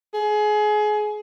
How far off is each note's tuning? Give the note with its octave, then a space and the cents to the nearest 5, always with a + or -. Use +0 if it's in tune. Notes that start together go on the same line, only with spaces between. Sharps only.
G#4 +25